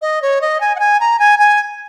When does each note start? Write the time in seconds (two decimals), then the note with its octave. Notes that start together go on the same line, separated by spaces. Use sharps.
0.02 D#5
0.22 C#5
0.42 D#5
0.61 G#5
0.76 F#5
0.80 G#5
1.00 A#5
1.19 G#5
1.39 G#5